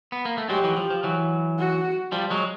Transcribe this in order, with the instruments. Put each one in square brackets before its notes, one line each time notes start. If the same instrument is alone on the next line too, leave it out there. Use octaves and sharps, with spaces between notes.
[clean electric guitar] B3
A#3
A3
[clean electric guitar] F#3 G#3 [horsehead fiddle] G4
[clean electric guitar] E3 F#3
F3
F3
E3 F#3
[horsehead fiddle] F#4
[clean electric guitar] F3 G3
F#3 G#3